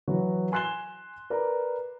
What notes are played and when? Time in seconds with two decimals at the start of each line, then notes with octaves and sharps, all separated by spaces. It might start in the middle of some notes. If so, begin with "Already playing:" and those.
0.08 E3 F#3 F#4 B4
0.52 G#5 C6 F#6 C7 E7 G7
1.30 A#4 B4 D5 A#5